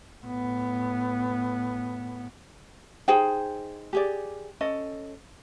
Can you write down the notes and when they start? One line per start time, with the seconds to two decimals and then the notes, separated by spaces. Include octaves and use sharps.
0.24 A2 B3
3.08 D#4 G#4 C5 G5
3.93 G4 G#4 D5
4.61 C#4 A4 D#5